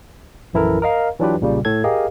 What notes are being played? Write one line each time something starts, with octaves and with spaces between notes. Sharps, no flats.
A#1 F#2 E3 E4 A4 A#4
A#4 D#5 F5 A#5
E3 F#3 D4 F4 G4 B4
B1 A#2 C#3 G3
A2 A4 G#6
G4 G#4 A#4 D#5 F5